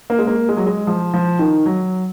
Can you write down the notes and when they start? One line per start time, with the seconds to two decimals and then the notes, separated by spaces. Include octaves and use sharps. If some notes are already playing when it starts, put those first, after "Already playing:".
0.10 A#3
0.19 G#3
0.27 A#3
0.49 G#3
0.57 F#3
0.67 G#3
0.87 F3
1.14 F3
1.39 D#3
1.66 F#3